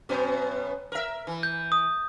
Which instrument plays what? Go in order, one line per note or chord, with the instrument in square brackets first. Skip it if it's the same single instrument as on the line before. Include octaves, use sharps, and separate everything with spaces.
[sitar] F#2 B2 B3
A#4 E5
E3
[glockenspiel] G6
D#6